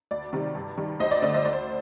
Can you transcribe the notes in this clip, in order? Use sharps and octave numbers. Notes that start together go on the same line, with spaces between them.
D2 D5
C3 D#3 G3
G2
D#3 G3
D2 C5 D#5
D5
D3 A3 D5
C5 D#5
D2 D5
C5